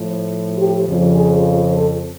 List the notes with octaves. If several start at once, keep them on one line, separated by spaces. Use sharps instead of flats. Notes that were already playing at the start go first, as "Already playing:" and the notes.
Already playing: A2 F3
G4
F2 C#3 F3
G#4
A4